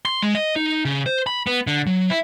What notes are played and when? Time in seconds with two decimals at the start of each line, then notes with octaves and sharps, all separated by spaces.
0.05 C6
0.22 G#3
0.35 D#5
0.56 D#4
0.85 C#3
1.06 C5
1.27 B5
1.47 B3
1.67 D3
1.86 F#3
2.10 E4